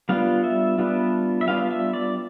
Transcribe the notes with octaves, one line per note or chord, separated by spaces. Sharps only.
G3 B3 D4 F4 F5
E5
G3 B3 D4 F4
E5
G3 B3 D4 F4 F5
E5
D5